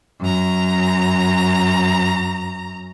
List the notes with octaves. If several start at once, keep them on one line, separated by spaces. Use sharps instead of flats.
F#2 A#5